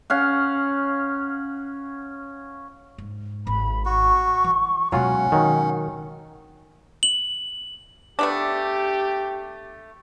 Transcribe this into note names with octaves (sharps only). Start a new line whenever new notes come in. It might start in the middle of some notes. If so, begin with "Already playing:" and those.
C#4 F5 F#5
G#2
G#1 A3 B5
F#4 C#6
E3
B2 F#3 G#3 C#4 F4 F#5
D#3 F#3
F#7
A3 B3 D4 G4